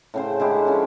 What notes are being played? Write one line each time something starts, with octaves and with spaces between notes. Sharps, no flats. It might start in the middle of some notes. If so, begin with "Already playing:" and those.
A2 C#3 C5
D3 G#3 E4 G4
F3 C#4